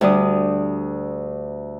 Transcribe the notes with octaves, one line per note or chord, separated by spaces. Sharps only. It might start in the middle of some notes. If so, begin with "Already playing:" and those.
D2 G3 D4 D#6